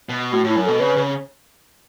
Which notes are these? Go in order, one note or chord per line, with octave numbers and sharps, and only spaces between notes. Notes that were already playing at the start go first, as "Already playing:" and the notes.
B2
A2 F#4
A2 E4
F#2
B2 A4
C#3 B4
C#3